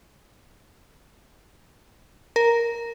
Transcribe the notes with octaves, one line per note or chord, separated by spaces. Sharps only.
A#4